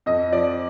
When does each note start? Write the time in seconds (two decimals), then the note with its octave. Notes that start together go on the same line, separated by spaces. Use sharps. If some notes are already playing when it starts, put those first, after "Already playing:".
0.06 F2 D#5
0.32 F3 D5